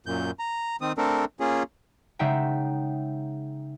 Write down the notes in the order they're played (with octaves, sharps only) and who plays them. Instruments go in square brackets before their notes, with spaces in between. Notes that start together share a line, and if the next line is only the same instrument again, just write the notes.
[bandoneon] F#2 A#2 G6
A#5
D#3 C4 D#6
A3 C4 D4 A4 A#4
A#3 C#4 F4 G#4
[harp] C#3 G#3 D#4 E5 F#5 G5